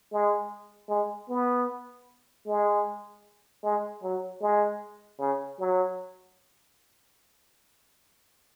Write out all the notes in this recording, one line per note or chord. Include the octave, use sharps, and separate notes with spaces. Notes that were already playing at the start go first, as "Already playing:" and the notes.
G#3
G#3
B3
G#3
G#3
F#3
G#3
C#3
F#3